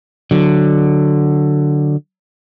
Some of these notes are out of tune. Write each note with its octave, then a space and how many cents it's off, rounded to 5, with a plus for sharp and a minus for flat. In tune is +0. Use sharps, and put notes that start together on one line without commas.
D3 +10 F#3 +0